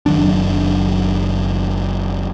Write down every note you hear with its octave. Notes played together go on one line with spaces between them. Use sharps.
F#1 D#3 F#3 D4